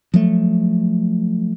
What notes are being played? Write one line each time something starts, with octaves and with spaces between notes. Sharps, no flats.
F3 F#3 A3